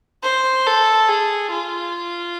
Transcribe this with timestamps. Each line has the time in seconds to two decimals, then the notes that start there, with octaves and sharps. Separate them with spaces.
0.23 C5
0.66 A4
1.09 G#4
1.51 F4